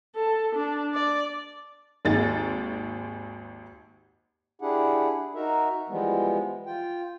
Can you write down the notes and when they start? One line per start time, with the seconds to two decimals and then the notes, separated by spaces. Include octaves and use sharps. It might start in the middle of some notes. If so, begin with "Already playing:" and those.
0.15 A4
0.55 D4
0.94 D5
2.05 G#1 D#2 D#4 G#4 A6
4.62 D4 E4 G4 G#4 F#5
5.35 D#4 F#4 A#4 E5
5.89 E3 F3 G3 G#3 B3
6.66 F4 G5